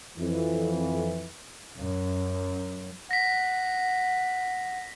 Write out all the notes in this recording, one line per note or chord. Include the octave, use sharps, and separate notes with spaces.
F2 E3
F#2
F#5 A#6 B6